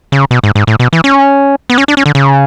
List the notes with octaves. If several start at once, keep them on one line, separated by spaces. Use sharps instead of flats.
C#3
B2
G#2
G#2
A2
B2
E3
C#4
B3
C#4
D4
C#4
D3
C#3